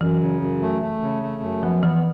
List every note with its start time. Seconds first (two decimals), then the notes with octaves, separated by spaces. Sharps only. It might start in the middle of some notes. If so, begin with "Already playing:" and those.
0.01 F#2 E3
0.21 C#3
0.41 F#2
0.62 A3
0.82 A3
1.02 C#3
1.23 A3
1.42 F#2
1.63 F3 B3
1.83 E3 B3